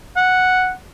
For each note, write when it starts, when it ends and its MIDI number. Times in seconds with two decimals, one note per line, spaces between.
0.16 0.72 78